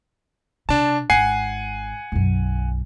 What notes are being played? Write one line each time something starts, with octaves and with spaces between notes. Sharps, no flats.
C3 D4 A5
G#1 F#5 G#5 C7
B1 F#2